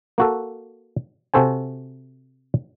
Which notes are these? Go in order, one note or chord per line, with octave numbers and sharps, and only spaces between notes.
A#3 F#4 A4
C3 F#4 A4 C5 G#5